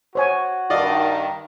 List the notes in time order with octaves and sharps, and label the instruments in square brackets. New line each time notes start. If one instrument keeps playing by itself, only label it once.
[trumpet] F#4 [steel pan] C5 C#5 G#5
[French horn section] G2 D#3 [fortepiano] D5 D#5 F5